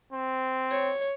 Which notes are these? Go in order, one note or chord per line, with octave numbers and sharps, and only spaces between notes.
C4
C#5